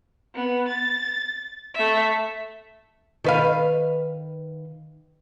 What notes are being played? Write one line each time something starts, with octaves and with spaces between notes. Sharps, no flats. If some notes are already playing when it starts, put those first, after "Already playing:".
B3
A6
A3 E5
D#3 B4 F5